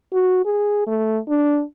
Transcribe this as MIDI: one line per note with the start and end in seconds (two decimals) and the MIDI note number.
0.13 0.43 66
0.45 0.82 68
0.87 1.18 57
1.28 1.62 62